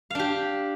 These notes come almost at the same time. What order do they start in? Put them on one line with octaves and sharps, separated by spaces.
F5 D4 G4